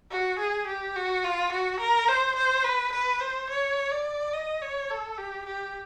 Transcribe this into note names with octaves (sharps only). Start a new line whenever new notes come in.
F#4
G#4
G4
F#4
F4
F#4
A#4
C5
C5
B4
B4
C5
C#5
D5
D#5
C#5
A4
G4
G4